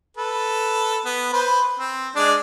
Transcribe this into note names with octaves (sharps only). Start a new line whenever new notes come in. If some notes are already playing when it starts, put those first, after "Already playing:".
A4 B4
B3
B4 C5
C4
G#3 D4 D5